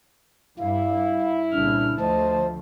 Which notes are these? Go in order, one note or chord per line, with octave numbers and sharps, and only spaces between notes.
G2 E4 F5
C2 A#2 C#3 D4 F6
D2 F3 A3 C5 D#5 A5